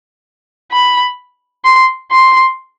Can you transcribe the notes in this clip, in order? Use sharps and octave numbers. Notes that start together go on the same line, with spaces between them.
B5
C6
C6